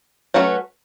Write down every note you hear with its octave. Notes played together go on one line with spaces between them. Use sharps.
F#3 A3 C#4 F#4 B4